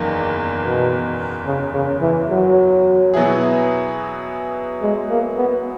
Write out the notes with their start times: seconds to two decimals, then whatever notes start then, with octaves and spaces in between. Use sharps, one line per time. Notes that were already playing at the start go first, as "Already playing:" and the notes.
Already playing: F#1 E2 D#3 A#3
0.62 B2
1.46 C#3
1.73 C#3
2.01 E3
2.30 F#3
3.14 B2 F#3 B3 E4 G#4
4.82 G#3
5.10 A#3
5.37 B3